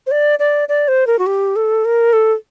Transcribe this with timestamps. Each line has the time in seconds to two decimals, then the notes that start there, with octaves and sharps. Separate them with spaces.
0.07 C5
0.11 D5
0.39 D5
0.68 D5
0.88 C5
1.07 A#4
1.19 F#4
1.26 G4
1.56 A4
1.85 A#4
2.13 A4